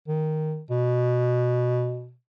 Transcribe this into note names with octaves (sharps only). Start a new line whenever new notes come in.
D#3
B2